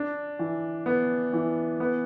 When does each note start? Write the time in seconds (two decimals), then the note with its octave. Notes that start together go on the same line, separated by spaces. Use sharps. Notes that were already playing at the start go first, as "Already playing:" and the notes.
Already playing: D4
0.39 E3
0.86 B3
1.33 E3
1.80 B3